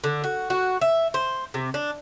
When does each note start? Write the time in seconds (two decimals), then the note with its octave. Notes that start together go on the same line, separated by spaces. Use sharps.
0.04 D3
0.24 F#4
0.50 F#4
0.81 E5
1.14 C5
1.54 C3
1.74 D4